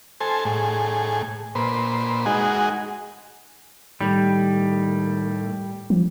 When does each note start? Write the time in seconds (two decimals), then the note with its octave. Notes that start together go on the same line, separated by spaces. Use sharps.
0.20 A4 C5 G#5
0.45 A2 G#4
1.55 A#2 B4 C5
2.26 G#3 D#4 F#4 G#4
4.01 A2 D#3 G3
5.90 F3